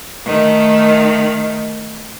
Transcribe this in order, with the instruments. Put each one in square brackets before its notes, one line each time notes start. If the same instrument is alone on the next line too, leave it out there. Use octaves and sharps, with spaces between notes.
[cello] D#3 A3